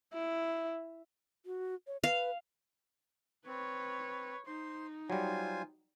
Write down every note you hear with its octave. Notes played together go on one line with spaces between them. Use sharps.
E4
F#4
C#5
B4 F5
C4 B4 C#5
D#4 C5 C6
F#3 G3 F4 C5 G#5